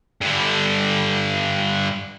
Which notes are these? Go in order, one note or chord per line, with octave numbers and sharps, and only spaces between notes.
G2 D3